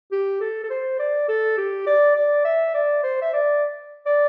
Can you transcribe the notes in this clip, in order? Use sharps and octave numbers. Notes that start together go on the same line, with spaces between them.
G4
A4
A4
C5
D5
A4
G4
D5
D5
E5
D5
C5
E5
D5
D5